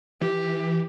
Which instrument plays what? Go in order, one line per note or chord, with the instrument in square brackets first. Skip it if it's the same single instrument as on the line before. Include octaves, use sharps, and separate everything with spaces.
[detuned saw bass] E3 [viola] G4